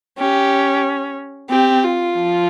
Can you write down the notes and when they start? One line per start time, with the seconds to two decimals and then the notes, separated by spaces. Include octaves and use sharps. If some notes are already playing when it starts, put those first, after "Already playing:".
0.18 C#4 G4
1.50 C4 G4
1.83 F4
2.16 F3